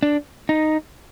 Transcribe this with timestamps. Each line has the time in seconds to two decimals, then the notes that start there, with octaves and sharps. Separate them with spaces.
0.03 D4
0.49 D#4